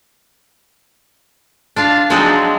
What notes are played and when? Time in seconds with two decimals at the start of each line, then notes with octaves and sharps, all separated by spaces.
1.76 D4 F4 F5
2.10 F3 F#3 G#3 C4 D4 D#4